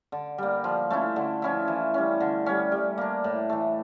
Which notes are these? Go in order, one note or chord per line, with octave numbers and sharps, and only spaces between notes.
D3
G3 A#3
F3
A3 C#4 E4
D3
F3 C#4 E4
E3
G3 C#4
D3
G3 C#4
G3
A#3 D4
A2
E3 A3